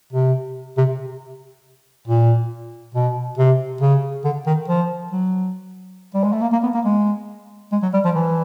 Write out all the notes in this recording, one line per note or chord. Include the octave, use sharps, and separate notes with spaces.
C3
C3
A#2
B2
C3
C#3
D3
D#3
F3
F#3
G3
G#3
A3
A#3
A#3
B3
A#3
G#3
G#3
F#3
G3
F3
E3